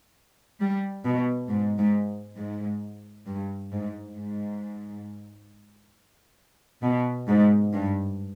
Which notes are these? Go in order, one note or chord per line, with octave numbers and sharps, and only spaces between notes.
G3
B2
G#2
G#2
G#2
G2
G#2
G#2
B2
G#2
G2